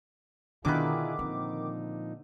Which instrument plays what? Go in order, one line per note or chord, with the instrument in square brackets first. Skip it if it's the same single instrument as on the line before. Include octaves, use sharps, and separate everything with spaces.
[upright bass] B2 [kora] D3 B4 [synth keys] D#3 D6 [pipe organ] E4 F4 G#4
[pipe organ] A#2 F3 D#4 [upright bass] C4